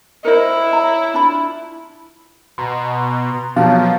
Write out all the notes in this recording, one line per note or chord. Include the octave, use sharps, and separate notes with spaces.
E4 A#4 C5 D#5
C#5 A#5
D4 F4 B5
B2 A#5 C6
B2 F3 F#3 F5 A5